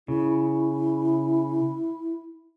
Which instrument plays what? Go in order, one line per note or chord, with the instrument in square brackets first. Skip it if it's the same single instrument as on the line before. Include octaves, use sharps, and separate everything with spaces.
[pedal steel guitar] C#3 [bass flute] E4